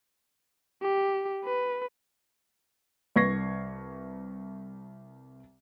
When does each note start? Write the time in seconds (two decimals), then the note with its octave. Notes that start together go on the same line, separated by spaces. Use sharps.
0.82 G4
1.44 B4
3.16 C2 B4 C#6 G#6 A#6 C7